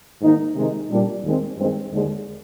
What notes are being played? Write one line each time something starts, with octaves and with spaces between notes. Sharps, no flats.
G#2 D#3 A#3 D#4
C3 D#3 G#3 D#4
A#2 G3 D4
D#2 D#3 G#3 C4
G2 D#3 G#3 C4
D#2 D3 G#3